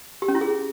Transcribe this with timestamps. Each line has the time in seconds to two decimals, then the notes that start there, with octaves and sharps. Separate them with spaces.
0.22 G4
0.28 C#4
0.35 E4
0.41 G#4